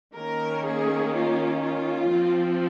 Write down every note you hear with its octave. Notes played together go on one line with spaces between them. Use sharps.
D#3 A#3 C#4 A#4
G#4
F4
F4
F3 C4